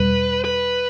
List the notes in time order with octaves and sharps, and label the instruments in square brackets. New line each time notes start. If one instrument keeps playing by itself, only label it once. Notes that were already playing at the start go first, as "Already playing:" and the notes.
Already playing: [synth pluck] E2 B2 G3 [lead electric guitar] B4
[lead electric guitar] B4